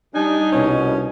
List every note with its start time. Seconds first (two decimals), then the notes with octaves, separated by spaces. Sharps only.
0.15 G3 D4 D#4 G#5
0.52 C2 B2 C#4